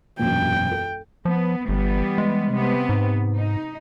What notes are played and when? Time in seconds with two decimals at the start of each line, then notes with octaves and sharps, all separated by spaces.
0.19 E1 A#1 F#2 G5
0.71 A4
1.25 F3 B3
1.69 G1 E3 G3 B3
2.18 G#3
2.53 C3 B3
2.89 G#2
3.36 D#4